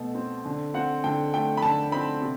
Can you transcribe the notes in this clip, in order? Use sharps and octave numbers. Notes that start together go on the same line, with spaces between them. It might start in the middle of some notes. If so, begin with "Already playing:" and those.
Already playing: B2 A3
C4
D3
C4 F#5
D3 G5
A3 G5
B5
D3 A5
C4 B5
C3